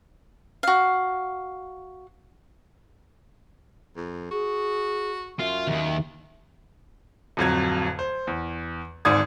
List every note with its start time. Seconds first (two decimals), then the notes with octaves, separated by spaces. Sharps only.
0.63 F#4 F5
3.97 F2
4.31 F#4 G#4
5.39 F#2 F4 E5
5.67 D#2 D#3
7.37 D1 F2 F#3 G#6
7.99 C5
8.27 E2
9.05 D1 G#1 G#2 D5 D#6 G#6